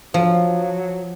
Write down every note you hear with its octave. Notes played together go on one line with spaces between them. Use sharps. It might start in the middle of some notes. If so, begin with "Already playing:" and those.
F3 F#3